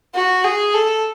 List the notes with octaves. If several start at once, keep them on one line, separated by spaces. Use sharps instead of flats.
F#4
G#4
A4